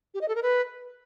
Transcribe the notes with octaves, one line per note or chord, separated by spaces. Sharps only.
G4
D#5
A4
A#4
B4